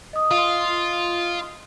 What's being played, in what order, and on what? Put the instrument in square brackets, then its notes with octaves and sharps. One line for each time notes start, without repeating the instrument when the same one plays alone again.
[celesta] D#5 D#6
[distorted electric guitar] F4